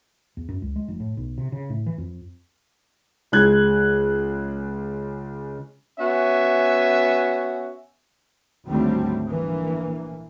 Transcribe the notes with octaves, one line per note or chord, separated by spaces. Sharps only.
E2
F#2
C#2
G#3
F1
A2
B1
C3
C#3
A2
E3
F2
C#2 G#3 F#6 G#6
B3 C#4 F#4 E5 G#5
G#1 D2 F#3 G3 A3 C4
A#1 E3 A#3